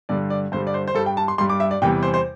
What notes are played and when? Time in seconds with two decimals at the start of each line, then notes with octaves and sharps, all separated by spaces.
0.09 G2 D3 G3 D5
0.30 D5
0.52 G2 D3 G3 C5
0.67 D5
0.74 C5
0.88 C5
0.95 G2 G3 A4
1.06 G5
1.17 A5
1.28 C6
1.38 G2 G3 C6
1.49 D6
1.60 E5
1.71 D5
1.82 E2 C3 E3 G3 G5
2.03 C5
2.14 C5